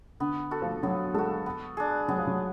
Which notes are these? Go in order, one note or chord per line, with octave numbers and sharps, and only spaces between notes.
D3 B3
F#4 A4
F3
F#3 B3
G#3 F#4 A4
B3
D4 G#4
F#3 B3
F3
F#3